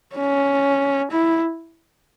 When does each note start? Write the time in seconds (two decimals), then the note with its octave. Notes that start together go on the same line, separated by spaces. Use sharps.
0.15 C#4
1.11 E4